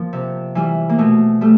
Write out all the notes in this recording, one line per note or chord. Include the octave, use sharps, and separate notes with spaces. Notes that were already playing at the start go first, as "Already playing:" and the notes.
Already playing: F3 A#3
C3
E3 G3
A#3
B2 A3
G3 A3